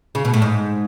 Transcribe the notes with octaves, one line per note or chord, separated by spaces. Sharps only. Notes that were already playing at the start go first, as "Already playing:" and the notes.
C#3
B2
A2
G#2